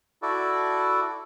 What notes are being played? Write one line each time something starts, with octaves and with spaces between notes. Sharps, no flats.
E4 F#4 A4 D5